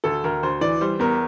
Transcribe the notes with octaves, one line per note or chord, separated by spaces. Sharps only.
D2 A4
D2 A#4
D2 C5
E3 D5
G3 C5
E2 A#4